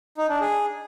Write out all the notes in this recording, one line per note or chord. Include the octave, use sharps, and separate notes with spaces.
D#4
D4
G#4